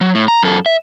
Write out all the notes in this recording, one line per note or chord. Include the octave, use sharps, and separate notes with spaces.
F#3
A2
A#5
F#2 A4
E5